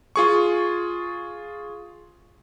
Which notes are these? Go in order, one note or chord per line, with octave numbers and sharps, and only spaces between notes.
F4 G#4 C#6